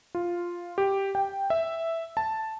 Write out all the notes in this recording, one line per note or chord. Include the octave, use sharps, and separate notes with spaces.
F4
G4
G5
E5
A5